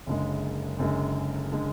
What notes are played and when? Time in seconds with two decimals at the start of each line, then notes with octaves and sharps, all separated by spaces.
0.07 F#1 F#2 D3 G#3
0.78 F#1 F#2 D3 G#3
1.52 D3 G#3